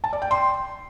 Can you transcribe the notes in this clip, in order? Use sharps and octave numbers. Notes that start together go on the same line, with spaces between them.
A5
D5
G5
C6